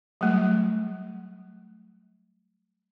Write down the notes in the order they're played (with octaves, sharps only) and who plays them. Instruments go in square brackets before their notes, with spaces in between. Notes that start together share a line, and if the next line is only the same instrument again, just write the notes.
[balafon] F#3 G3 A3